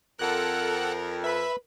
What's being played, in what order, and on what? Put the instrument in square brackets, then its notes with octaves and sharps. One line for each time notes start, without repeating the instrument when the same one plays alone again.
[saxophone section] F2 [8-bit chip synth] A4 F#5 F#6 [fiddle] A#4
[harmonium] B4 [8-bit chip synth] E5 B5